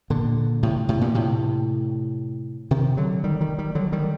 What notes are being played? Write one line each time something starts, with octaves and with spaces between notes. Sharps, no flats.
A#2 D3
A2 C3
A2 C3
G2 A#2
A2 C3
C3 D#3
D3 F#3
D#3 G3
D#3 G3
D#3 G3
D3 F#3
D#3 G3